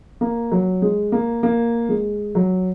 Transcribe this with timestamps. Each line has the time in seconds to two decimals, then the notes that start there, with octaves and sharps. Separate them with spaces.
0.21 A#3
0.52 F#3
0.82 G#3
1.12 A#3
1.43 A#3
1.89 G#3
2.35 F#3